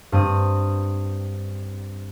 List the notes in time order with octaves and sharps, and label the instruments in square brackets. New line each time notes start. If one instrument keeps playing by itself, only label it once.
[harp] G2 C4 D#6